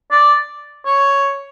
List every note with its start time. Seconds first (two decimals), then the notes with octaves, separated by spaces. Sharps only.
0.11 D5
0.85 C#5